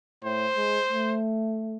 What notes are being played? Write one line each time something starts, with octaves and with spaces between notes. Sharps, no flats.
A2 C5
G#3
A3